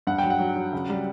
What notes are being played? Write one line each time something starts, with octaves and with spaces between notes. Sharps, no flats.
G2 F#5
G5
F#3
F#5
F#3
F#3
C#2
G3